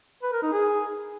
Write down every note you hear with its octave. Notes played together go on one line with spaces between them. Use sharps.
B4
A#4
D#4
G#4